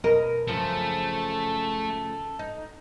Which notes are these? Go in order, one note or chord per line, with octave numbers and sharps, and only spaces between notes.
B2 A#4 D#5
F#2 C#3 F3 A3 A4
D#4